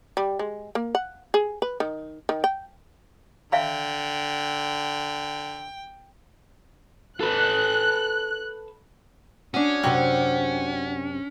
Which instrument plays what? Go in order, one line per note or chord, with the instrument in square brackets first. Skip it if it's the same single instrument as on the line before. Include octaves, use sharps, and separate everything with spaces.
[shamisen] G3
G#3
A#3
F#5
G#4
B4
D#3
D#3
G5
[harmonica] D3 [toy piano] E5 F5 B5 [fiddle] G5
[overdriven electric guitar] A4 B4 [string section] F#6
[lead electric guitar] C#4 [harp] D4 D#6 [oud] F#4
[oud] F#2 C3 C5 [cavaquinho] F#4 D5 F#5 [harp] G5